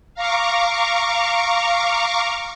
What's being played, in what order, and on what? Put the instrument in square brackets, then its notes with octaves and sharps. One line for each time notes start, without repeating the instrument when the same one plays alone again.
[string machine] F5 A#5 C#6 D6